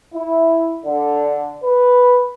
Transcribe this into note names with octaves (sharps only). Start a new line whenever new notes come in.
E4
D3
B4